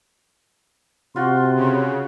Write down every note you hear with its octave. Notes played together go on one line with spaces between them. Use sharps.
C3 F4 F#4 C6
C#3